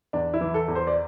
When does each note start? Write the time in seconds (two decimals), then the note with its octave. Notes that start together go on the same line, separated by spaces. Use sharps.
0.13 E2 D4
0.34 E4
0.41 E3
0.54 A4
0.68 E2
0.75 C5
0.87 D5